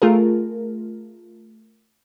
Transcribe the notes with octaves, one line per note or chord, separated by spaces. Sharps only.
A3 F4 G#4 A#4